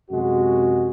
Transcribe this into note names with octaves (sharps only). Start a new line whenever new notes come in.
F#2 C3 G#3 F#4